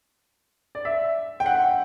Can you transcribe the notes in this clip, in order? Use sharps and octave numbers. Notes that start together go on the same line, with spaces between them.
D5
E5
G5
F#5